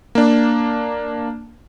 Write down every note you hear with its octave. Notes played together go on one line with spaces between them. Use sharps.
A#3 D4